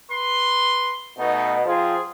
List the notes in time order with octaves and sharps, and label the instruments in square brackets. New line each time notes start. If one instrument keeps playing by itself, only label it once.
[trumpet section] B4 C6
[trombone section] B2 [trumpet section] A3 D#4
[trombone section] F3 C4 F4 [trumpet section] G#4